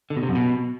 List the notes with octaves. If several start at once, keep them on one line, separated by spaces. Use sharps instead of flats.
D3
B2
C3
F#2
B2